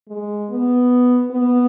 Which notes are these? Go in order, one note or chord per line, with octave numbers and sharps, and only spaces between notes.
G#3
B3
B3